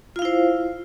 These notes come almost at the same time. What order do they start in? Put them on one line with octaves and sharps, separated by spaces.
F4 F5 E4 C5